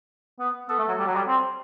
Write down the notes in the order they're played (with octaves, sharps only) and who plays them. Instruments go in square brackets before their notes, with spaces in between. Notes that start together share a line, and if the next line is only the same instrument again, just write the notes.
[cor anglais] B3
[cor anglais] B3 [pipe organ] A4
[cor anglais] A3
F#3
G3
F#3
G3
C4